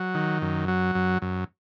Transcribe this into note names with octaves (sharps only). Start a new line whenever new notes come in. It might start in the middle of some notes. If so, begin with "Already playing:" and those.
Already playing: F#3
D#3
F#2
F#3
F#2
F#2